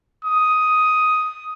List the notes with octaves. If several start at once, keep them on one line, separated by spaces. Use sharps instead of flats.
D#6